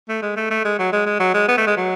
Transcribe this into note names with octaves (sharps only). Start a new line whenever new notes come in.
A3
G#3
A3
A3
G#3
F#3
G#3
G#3
F#3
G#3
B3
A3
G#3
F#3